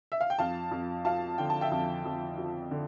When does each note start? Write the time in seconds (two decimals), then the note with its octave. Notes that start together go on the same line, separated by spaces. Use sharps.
0.12 E5
0.21 F5
0.30 G5
0.39 F2 F5 A5
0.71 F2
1.05 F3 F5 A5
1.38 D3 G5
1.50 A5
1.61 E5 G5
1.71 F2
2.05 F2
2.38 F3
2.71 D3